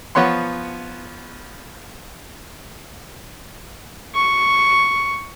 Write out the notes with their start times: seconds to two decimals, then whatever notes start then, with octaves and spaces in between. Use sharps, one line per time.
0.15 F3 B3 C#5 F#5 C6
4.15 C#6